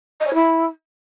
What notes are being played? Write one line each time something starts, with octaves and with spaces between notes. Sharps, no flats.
D#5
C#5
E4